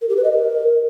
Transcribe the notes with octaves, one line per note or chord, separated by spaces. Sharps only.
A#4
G4
B4
D#5
A#4